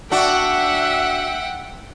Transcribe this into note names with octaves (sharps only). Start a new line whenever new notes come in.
D4 F#4 E5 F#5 G5